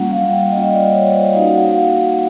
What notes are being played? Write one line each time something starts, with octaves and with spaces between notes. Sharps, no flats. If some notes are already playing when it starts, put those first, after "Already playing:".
Already playing: G3 A#3 C#4 F4 F#5
F5
G5
G3 A#3 C#4 F4 D#5
D5
C#5
C5
A#3 D#4 F#4 F5
F#5
F5